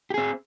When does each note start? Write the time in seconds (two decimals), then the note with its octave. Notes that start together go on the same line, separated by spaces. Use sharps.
0.10 G4
0.14 G#4
0.18 C4